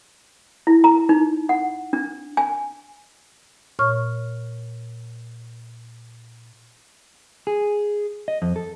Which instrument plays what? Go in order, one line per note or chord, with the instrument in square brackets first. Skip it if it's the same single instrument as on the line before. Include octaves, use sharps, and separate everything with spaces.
[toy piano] E4
A#5
D#4
F#5
D4
G#5
[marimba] A#2 C#5 C#6 F6
[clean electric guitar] G#4
D#5
F2
A4